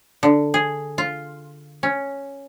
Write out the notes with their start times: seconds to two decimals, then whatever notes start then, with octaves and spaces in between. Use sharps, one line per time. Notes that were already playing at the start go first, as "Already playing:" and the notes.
0.23 D3
0.54 G#4
0.98 F4
1.83 C#4